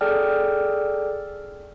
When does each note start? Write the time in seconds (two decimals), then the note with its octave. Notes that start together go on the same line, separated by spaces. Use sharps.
0.01 G#4 A4 D5 G5 F6